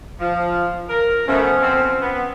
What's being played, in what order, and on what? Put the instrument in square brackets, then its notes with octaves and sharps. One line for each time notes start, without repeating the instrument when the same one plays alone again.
[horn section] F3
A#4
[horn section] B2 A3 [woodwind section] F3 B3 C#4
[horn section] C4
B3